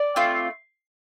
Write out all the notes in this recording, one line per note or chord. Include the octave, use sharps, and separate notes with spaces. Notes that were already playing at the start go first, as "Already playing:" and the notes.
Already playing: D5
A3 C4 F4